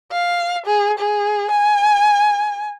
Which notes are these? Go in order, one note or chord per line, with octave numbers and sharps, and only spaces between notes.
F5
G#4
G#4
G#5